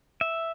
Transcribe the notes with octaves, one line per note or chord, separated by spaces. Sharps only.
E5